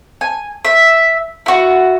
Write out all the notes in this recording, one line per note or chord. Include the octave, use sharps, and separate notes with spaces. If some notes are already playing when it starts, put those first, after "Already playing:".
G#5
E5
E4 F#4